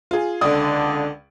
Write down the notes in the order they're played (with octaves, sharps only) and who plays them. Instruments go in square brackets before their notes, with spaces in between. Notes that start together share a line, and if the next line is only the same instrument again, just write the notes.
[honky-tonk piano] F4 G#4
[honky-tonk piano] C#2 D5 D#6 [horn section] D3